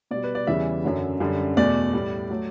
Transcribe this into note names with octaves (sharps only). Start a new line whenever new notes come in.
B2 G3 D5
B4
D5
E2 C#3 E3 G3 E5
F#2 D3 F#3
F#2 D3 G3
E2 B2 A3 D5
A2 G3
F#3 A3